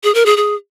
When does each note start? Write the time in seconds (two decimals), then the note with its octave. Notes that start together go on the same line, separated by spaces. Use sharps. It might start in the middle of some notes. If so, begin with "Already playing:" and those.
0.04 G#4
0.15 A#4
0.26 G#4
0.37 G#4